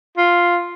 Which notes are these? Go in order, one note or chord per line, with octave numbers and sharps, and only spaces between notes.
F4